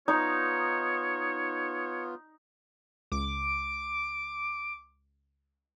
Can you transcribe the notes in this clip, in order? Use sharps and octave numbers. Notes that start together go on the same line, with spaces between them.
B3 D#4 F4 C#5
C#2 D6